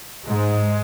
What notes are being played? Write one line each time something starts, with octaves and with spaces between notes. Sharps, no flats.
G#2 G#3